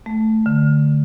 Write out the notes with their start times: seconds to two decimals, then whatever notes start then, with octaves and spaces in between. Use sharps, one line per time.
0.06 A3
0.46 D3